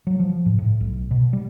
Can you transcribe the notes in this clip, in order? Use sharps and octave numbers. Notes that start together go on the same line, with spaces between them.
F#3
F3
A2
A2
B1
B2
G3